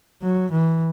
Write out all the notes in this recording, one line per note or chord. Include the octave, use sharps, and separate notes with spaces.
F#3
E3